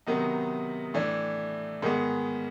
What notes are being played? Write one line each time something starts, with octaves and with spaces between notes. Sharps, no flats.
C3 D#3 F#3 B3 D#4
A2 E3 A3 D4
G#2 D#3 G#3 B3